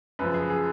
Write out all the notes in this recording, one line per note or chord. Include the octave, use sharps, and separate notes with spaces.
F#2 C#3 F3 B4
G#4
G#4